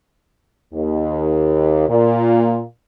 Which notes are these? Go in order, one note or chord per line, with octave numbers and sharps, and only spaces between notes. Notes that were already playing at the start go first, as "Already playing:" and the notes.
D#2
A#2